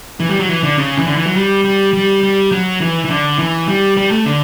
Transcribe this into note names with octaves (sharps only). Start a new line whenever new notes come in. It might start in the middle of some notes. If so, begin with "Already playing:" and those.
E3
G3
F#3
E3
D3
C#3
E3
D3
E3
F#3
G3
G3
G3
G3
F#3
E3
E3
D3
E3
G3
G3
A3
D3